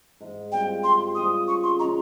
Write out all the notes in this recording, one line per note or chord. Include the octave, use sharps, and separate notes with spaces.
G#2
G3 C4 F4 G5
G#2 C6
G3 C4 F4 D#6
C#3 C#6
C6
G#3 C#4 F4 A#5